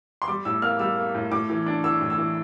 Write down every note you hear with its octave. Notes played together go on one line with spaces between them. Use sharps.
C6
G3 D6
A2 E6
A#3 F6
G3 E6
A#3
A2
A2 D6
E3
D4
E3 E6
A2
E6
E3